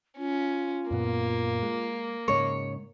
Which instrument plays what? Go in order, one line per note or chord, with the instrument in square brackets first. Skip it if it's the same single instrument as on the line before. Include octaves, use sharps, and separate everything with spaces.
[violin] C#4 [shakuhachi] F4
[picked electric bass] F#2 A#2 B3 [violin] A#3
[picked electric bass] G#3
[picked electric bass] G#2 C#3 G#3 [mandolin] C#5